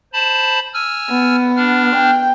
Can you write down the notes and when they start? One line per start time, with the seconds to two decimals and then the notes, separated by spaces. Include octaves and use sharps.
0.13 C5 A5 B5
0.74 G#5 E6 F6
1.10 B3
1.56 D4 F6
1.96 G5